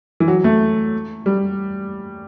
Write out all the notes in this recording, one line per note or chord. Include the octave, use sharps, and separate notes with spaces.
E3
F#3
A3
G3